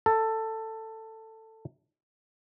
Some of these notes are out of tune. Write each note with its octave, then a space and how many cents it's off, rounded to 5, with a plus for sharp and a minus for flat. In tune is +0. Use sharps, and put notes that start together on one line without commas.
A4 +15